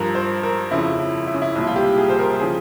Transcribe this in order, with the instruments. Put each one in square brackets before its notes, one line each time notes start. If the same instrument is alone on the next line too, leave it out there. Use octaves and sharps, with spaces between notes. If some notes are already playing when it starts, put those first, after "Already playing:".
Already playing: [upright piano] G2 F3 A#4
C5
A#4
F2 C#3 F3 E4
E4
E4
C#4
E4
C2 A#2 F3 E4
F4
G4
G#4
C5
A#4
C#3 F3 G#4